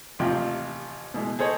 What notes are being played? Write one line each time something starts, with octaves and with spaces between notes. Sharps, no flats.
A1 D#2 C3 F3 F4 G5
B2 E3 G#3
G#4 A4 C5 C#5 D#5